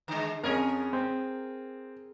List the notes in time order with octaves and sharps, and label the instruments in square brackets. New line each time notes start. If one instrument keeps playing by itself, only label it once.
[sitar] D3 G#3
[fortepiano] F2 C#4 [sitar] G#4 A#4
[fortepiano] C4